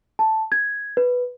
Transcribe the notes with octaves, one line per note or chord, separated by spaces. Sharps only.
A5
G#6
B4